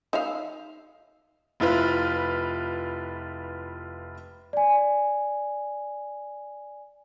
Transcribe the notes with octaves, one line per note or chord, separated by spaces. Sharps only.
D#4 E5 F5
F1 E4 F4 B4
D5 G#5